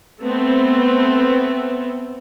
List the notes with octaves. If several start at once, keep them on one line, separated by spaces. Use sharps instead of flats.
A3 B3 C4